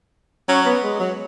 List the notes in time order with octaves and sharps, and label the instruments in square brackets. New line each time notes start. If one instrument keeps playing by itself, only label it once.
[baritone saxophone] F#3 [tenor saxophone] C#4
[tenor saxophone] B3
G#3
F#3